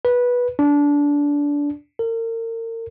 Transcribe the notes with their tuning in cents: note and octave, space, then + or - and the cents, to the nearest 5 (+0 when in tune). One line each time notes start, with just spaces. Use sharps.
B4 -15
D4 -20
A#4 -35